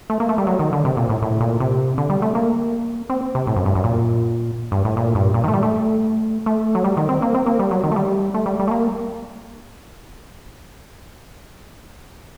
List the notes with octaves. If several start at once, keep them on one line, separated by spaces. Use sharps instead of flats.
A3
A#3
A3
G3
F#3
D#3
D3
C3
A#2
A2
A2
A#2
C3
D3
G3
A3
A#3
C4
C3
A2
F#2
G2
F#2
A#2
G2
A2
A#2
G2
A#2
D#3
A3
G3
A3
A3
F#3
G3
D#3
C4
A#3
C4
A#3
G3
F#3
D#3
A3
G3
A3
G3
G3
A3
A#3